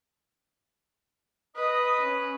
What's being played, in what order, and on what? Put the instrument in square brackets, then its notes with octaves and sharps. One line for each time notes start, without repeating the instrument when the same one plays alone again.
[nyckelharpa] B4 [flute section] D#5 D#6
[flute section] C#4